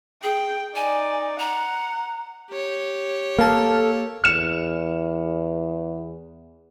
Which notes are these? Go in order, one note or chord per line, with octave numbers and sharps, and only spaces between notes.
G#4 G5
D#4 D5 G#5
F#5 A#5
G4 C#5
A#3 A4 A5 F6
E2 F6 C#7 E7